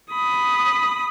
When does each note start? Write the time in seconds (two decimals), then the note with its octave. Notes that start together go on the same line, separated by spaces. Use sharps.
0.14 B5 D#6